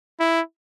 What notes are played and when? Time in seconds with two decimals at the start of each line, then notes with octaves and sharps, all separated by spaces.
0.20 E4